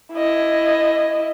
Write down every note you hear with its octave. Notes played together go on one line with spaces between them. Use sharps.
E4 D#5